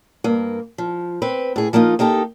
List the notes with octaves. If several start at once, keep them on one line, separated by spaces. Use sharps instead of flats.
G2 A#3
F3
C4 B4
A2 G#4
F3 A#3 B3 D#4 F4
A#3 D#4 G4 A4